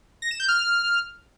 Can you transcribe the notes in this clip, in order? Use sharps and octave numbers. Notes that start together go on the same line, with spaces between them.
A#6
E7
G6
F6